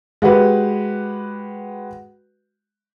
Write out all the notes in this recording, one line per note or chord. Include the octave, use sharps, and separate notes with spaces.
G#3 F#4 G4 B4